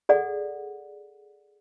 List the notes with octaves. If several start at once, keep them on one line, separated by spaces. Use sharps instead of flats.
G#4 A4 D5 F#5